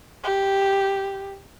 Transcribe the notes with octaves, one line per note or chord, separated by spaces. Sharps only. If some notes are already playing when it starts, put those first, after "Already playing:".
G4